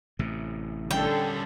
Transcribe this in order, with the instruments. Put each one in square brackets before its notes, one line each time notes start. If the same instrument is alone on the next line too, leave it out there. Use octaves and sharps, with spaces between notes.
[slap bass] A1 A2 C3
[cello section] D3 A4 [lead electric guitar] G3 C#4 [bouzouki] G5